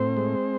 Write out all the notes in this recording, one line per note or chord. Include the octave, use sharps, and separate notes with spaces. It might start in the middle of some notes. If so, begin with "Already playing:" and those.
Already playing: A2 C4 C5
G#3